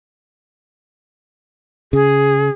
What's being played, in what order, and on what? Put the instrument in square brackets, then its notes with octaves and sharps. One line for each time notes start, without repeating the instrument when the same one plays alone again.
[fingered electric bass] C#3 [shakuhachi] G#4